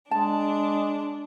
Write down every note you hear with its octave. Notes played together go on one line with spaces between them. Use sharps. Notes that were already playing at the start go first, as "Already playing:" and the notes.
G#3 D4 A5